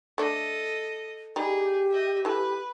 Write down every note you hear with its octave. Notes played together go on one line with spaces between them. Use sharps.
A3 D4 A4 D#5
G3 D#4 G4 G#4
D#5 E5
E3 A4 B4